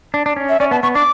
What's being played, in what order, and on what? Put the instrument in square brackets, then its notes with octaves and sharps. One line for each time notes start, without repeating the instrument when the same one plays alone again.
[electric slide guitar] D4
D4
C#4
[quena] E5
[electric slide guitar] C#4 [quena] D5
[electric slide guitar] B3 [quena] A5
[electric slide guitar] B3 [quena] C#6
[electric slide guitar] D4 [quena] D6